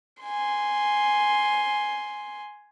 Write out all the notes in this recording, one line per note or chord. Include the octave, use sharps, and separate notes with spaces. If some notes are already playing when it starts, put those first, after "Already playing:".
G#5 C6